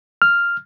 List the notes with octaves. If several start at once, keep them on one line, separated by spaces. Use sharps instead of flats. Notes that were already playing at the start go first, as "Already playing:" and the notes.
F6